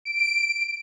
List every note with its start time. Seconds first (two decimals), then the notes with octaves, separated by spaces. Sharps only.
0.05 D7